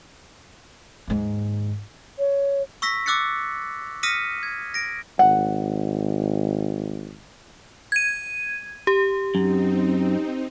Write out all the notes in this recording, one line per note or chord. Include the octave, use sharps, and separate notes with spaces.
D#2 G#2
C#5
C#6 E6 A#6 B6
D6 E6 F#6 A6 C#7
D#6 F6 A#6 B6 C#7 D#7
G#6
A#6 D7
G#1 F#5
G#6 D#7
G4
F#2 C4 D#4